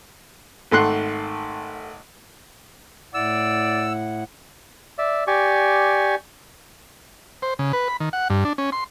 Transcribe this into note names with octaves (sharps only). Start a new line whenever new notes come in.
G#1 A3 F#5 C6 F#6
A2 E4 D5 F#5 E6
D5 E5
G4 D5 G#5 C#6
C5
C#3
B4
B5
D#3
F#5
G2
D4
C#4
C6